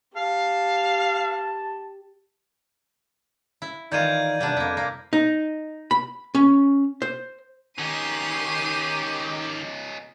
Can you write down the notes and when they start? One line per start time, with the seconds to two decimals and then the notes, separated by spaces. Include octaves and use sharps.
0.16 G4 F5 A5
3.62 E4
3.92 D#3 E3 D#4 F4 D5 G6 G#6 D#7
4.40 C3 G3 B3 D4
4.57 F2 A#3 E4
4.77 C3 A#3
5.13 D#4
5.91 B5
6.35 C#4
7.02 C5
7.78 D#3 C#4 D#4 G4 C7 D#7